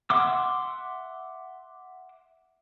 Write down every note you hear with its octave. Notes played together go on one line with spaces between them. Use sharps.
E5 F#5 C6 D6 E6